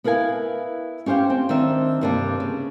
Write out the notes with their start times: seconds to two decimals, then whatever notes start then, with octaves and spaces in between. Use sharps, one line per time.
0.04 B3 E4 A#4 F5 G#5
1.06 C#4 G4 C5 F5 G5
1.30 C4
1.49 D#3 C4 D4 E5
2.01 G2 C3 G3 A#3 B3 D4
2.40 C#3